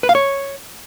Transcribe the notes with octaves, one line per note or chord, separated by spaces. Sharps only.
B4
F5
C#5